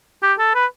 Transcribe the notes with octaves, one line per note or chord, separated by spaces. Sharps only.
G4
A4
B4